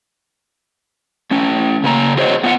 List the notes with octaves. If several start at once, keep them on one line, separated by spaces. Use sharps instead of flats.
A3 C#4
C#3 A#3 A#5
F#4 G#4 C5 C#5 D#5
B3 F4 E5 F#5